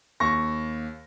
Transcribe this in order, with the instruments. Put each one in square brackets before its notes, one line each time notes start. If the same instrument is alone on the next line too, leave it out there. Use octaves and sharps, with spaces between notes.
[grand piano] D#2 C#6 A#6